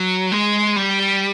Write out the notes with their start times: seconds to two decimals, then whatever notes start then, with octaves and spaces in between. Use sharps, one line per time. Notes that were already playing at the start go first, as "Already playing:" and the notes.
Already playing: F#3
0.32 G#3
0.76 G3